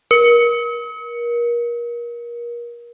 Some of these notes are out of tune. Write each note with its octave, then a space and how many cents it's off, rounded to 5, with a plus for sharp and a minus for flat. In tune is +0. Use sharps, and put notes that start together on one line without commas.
A#4 +30